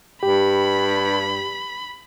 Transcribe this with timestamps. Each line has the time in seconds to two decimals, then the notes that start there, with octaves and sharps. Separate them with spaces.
0.23 G2 G4 B5